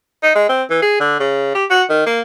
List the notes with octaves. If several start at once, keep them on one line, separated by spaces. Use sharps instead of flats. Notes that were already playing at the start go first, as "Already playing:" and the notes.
D#4
G#3
C4
E3
G#4
D3
C#3
G4
F#4
D#3
A#3